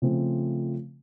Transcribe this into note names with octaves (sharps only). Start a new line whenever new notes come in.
C#3 F3 A3 C4